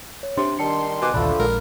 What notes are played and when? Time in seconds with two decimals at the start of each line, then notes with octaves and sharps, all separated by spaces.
0.23 C#5
0.37 C3 D4 C6
0.59 D#3 G3 A#4 A5 C6 C#7
1.01 B2 G#5 D6 F#6
1.14 A#1 D#2 D3 F3 A3 D4 B5
1.39 A#1 G#3 A#4